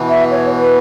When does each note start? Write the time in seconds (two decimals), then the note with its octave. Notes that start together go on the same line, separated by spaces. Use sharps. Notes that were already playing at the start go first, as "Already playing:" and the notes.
Already playing: B2 E3
0.09 E5
0.31 C#5
0.52 B4